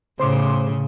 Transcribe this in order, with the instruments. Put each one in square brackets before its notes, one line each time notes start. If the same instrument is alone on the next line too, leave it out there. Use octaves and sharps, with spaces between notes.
[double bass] A2 [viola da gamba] C#3 [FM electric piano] C5 C6 D6